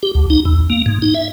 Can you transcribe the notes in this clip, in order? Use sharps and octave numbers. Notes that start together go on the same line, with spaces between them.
G4
D2
D#4
E2
A#3
G#2
D#4
E5